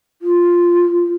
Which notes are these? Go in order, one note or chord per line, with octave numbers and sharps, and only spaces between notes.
F4